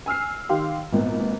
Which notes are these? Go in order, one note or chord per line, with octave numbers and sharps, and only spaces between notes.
G#5 E6 F6 C7
D#3 G4 F5 C6
G#1 A#2 B3